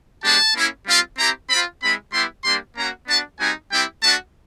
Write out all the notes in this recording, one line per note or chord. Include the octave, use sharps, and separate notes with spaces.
G#3 B3 D4 G4 A5
A#3 C#4 E4
G3 C4 F4
C4 E4 G4 A#5
C4 B5
F4
G#3 C4 E4 B5
G3 B3 E4 G4 C6
G3 A#3 D4 G4 C6
A#3 C#4 F#4 A#5
B3 D4 F#4 A5
G3 C4 D#4 F#4 G#5
G3 C4 E4 G4 G5
A3 D4 F#4 A5